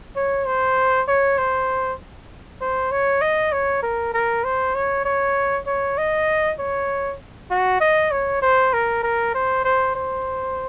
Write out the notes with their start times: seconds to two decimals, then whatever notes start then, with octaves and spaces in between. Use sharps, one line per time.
0.16 C#5
0.47 C5
1.08 C#5
1.38 C5
2.61 C5
2.91 C#5
3.21 D#5
3.52 C#5
3.83 A#4
4.14 A#4
4.44 C5
4.75 C#5
5.05 C#5
5.67 C#5
5.98 D#5
6.59 C#5
7.51 F#4
7.80 D#5
8.11 C#5
8.42 C5
8.73 A#4
9.03 A#4
9.34 C5
9.65 C5
9.95 C5